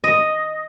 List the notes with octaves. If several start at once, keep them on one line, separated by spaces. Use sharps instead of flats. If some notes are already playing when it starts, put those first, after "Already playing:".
D#5